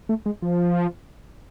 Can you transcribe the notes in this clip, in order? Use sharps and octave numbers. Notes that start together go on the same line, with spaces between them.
A3
G#3
F3